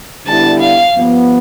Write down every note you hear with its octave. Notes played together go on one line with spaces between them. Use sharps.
D3 G3 B3 E4 A5
F5
G2 F3 B3